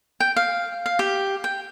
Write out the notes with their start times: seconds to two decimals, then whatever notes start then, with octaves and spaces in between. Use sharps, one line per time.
0.20 G5
0.36 F5
0.86 F5
0.99 G4
1.44 G5